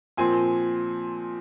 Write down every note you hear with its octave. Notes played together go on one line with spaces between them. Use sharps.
A#2 F3 C4 G#5 C6